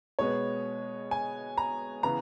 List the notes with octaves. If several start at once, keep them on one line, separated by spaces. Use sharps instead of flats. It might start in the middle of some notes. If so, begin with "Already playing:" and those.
B2 G#3 B3 C#5
G#5
A#5
C#3 E3 B3 A#5